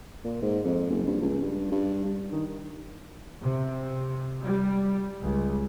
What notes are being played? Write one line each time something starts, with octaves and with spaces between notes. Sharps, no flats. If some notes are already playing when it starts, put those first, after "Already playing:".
A#2
G#2
F2
F#1
G2
C#2
G2
G2
G2
D#3
C3
G3
C#2